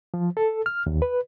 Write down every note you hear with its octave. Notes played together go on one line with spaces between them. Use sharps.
F3
A4
F6
D#2
B4